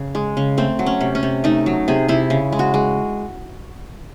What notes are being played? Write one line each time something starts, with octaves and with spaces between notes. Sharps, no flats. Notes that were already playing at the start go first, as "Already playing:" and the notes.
Already playing: C#3
G#3
C#3
A3 C4
F#3
C#4
C3
C#4
C3
A3 D#4
F#3
C3 G#4
C3 E4
C#3
G#3
F#4
G#3